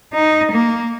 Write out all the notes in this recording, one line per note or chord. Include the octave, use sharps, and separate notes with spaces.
D#4
A#3